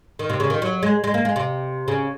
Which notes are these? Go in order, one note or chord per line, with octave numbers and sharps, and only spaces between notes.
D#3
C3
C#3
D#3
F#3
G#3
G#3
A#3
G#3
C3
C#3